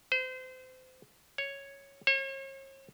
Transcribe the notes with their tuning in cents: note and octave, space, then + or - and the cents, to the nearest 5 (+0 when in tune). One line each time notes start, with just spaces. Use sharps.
C5 -30
C#5 +0
C#5 -40